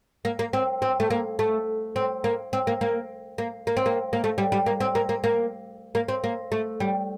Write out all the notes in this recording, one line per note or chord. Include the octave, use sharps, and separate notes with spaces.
A#3
A#3
C4
C4
A3
A#3
A3
C4
A#3
C4
A#3
A#3
A#3
A#3
C4
A#3
A#3
A3
G3
G3
A#3
C4
A#3
A#3
A#3
A#3
C4
A#3
A3
G3